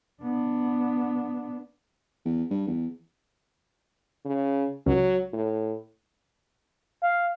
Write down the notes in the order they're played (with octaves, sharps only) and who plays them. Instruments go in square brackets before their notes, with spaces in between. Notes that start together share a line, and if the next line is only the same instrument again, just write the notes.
[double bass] B3 D4
[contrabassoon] E2
G2
E2
[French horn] C#3
[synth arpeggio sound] C#2 [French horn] F#3
[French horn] A2
[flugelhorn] F5